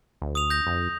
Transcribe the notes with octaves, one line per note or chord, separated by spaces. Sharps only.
D2
D#6 F7
G6 A#6
F2